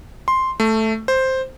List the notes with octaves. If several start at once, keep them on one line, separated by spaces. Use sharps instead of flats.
C6
A3
C5